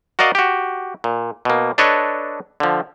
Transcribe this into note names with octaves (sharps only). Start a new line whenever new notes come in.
F#4 A#4 D5 D#5 F5
F#4 G4
A#2
B2 A#3
D4 A4 B4 C#5 D#5
D3 F3